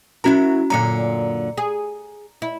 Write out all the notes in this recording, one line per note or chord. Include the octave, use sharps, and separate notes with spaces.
F#3 C#4 E4 F#4 A#4 A#5
F#2 A#2 D3 A#5 C#7
G#4
E4